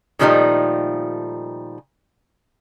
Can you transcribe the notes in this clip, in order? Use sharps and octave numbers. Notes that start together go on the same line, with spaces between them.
A#2 D#3 F3 G3 A3 D#4